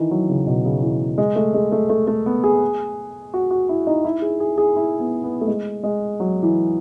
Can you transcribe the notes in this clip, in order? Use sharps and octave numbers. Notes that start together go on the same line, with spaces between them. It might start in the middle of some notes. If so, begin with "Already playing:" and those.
Already playing: D#3 E3
F#3
C#3
B2
C#3
E3
G#3
A3
G#3
A3
A3
A3
B3
G#4
F#4
F#4
E4
D#4
E4
G#4
G#4
G#4
E4
B3
B3
A3
G#3
G#3
F#3
E3